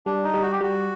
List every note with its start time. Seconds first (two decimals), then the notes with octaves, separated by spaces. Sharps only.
0.06 G3 D4
0.24 D#4
0.34 G3
0.42 F#4
0.52 G4
0.61 G3 F#4